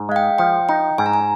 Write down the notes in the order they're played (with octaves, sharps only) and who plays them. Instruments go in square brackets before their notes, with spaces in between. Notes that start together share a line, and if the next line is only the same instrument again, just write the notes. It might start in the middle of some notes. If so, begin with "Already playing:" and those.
Already playing: [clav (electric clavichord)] G#2
[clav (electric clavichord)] G#3 [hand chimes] F5
[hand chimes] G5
[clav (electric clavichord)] F3 [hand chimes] G5
[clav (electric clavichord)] D#4 [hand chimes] G5
[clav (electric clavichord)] G#2 [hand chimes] G#5
[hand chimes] A#5
G#5